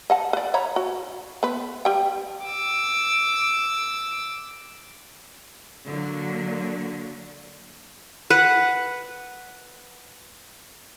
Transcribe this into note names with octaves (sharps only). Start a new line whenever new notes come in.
D#5 F#5 A5
B4 D5
C#5 A#5 B5
F#4
B3 B4
G3 G4 G5
D6 E6
D3 F#3 A#3
B4 F#5